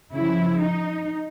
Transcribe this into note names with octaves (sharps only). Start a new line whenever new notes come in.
C#3 F3 E4
D#4